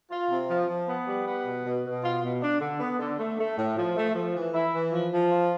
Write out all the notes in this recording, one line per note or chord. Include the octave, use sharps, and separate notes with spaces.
F4
C3
F3
F3
B3
G3
B3
B2
B2
B2
F4
B2
D4
D3
B3
D3
A3
A3
A2
F3
A3
F3
E3
E4
E3
F3
F3
F4